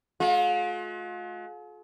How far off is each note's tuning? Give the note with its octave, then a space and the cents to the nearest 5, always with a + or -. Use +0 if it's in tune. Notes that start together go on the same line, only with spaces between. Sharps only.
G#3 +45 F4 +40